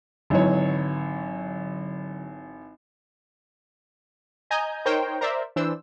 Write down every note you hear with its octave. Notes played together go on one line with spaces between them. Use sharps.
G#1 D3 E3 F#3 C#5
D#5 G#5 A#5 G6
D#4 A#4 C5 C#5 G5
A#4 C5 D5 E5
E3 D4 C5 E6